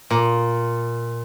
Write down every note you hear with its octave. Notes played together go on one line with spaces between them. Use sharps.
A#2